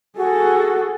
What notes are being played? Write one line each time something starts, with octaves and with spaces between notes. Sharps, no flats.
F#4 G#4 A4